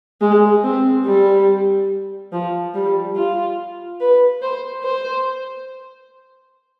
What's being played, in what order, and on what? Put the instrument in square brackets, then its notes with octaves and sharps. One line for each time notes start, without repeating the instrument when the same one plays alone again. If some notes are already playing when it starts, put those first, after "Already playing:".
[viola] G#3
C4
G3
F3
G3
F4
B4
C5
C5